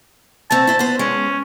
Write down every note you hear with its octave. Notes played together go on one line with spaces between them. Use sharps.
A3 C4 A5
E4 C5
B3 C5
G#3 C#4